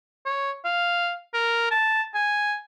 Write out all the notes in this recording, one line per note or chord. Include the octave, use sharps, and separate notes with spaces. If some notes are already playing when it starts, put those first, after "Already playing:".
C#5
F5
A#4
A5
G#5